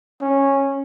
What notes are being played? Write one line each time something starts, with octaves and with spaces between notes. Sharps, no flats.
C#4